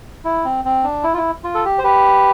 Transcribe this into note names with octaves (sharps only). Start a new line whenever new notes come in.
E4
C4
C4
D4
E4
F4
E4
F4
A4
G4
C5
G4 B4